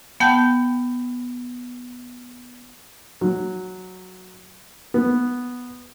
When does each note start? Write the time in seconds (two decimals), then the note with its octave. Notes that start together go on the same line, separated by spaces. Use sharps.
0.20 B3 F#5 G5 A5 G6
3.21 F#3
4.94 B3